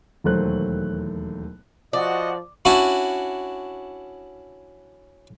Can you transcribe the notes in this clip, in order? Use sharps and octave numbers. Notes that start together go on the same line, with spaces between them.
E1 D#2 F#3 A3 C5 F#6
F3 F#4 D5 D#5
C#4 D4 E4 F#4